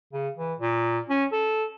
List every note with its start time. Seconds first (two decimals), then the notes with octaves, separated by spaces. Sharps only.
0.13 C#3
0.37 E3
0.60 A#2
1.10 C#4
1.32 A4